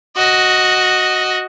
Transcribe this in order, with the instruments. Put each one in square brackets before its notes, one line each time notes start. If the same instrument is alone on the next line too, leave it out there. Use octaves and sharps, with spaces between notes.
[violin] F#4 D#5